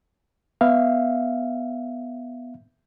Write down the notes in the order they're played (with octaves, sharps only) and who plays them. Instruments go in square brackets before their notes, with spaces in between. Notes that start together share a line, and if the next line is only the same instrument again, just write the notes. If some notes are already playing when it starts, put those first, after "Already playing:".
[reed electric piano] B3 E5 F5